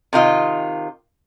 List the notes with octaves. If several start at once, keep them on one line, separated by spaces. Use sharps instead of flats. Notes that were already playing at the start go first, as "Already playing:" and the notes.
C3 D#3 F4 D#5